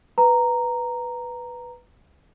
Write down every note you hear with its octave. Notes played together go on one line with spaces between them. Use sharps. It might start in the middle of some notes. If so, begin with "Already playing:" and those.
B4 A#5